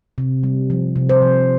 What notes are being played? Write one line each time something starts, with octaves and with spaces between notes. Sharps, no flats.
C3
G3
F3
C3
C5
F3